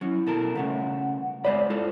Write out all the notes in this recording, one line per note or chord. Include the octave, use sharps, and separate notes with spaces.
F#3 C#4 E4
B2 A4 A#4
C#3 A3 C#4 F#5
G#3 C5 D5 B5
E4 F4 A4 C5